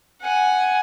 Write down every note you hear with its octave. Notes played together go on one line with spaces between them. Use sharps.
F#5 G#5